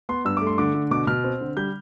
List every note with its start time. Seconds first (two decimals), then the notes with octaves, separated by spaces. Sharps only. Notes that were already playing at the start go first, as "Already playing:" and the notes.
0.09 B3 C6
0.25 G2 E6
0.37 A3 D6
0.47 C6
0.58 D3 D6
0.74 D3
0.91 B2 D6
1.07 B2 F6
1.24 C4
1.41 D3
1.57 G3 G6